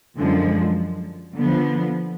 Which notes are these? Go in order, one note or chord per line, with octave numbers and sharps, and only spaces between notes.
F#2 D3 F3 G#3
D3 F3 B3